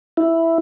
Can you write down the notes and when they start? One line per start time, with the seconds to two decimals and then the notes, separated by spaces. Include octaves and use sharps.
0.17 E4